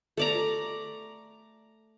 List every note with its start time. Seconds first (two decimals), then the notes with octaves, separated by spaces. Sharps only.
0.17 A3 D5 A#5